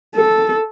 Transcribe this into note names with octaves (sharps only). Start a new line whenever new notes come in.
A4